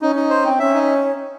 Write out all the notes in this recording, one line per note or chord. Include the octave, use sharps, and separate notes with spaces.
C#4 D#4
D#4
C5
C4
C#4 E5
D#4